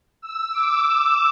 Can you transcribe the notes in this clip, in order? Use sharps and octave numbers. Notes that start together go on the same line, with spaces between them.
E6
D6